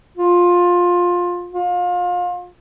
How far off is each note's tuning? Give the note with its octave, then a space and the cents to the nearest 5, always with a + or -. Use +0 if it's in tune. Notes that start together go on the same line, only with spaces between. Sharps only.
F4 +15
F4 +30